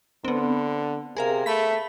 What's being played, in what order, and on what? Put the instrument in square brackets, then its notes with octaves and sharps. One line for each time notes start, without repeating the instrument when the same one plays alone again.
[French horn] D3 [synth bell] B3 C4
[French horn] C3 [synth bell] G#4 A#4 F5
[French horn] A3 [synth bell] B5 B6